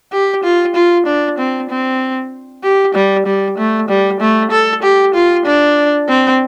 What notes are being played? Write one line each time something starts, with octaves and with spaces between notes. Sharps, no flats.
G4
F4
F4
D4
C4
C4
G4
G3
G3
A3
G3
A3
A4
G4
F4
D4
C4